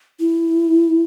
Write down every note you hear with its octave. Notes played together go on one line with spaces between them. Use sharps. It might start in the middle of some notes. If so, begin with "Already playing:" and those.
E4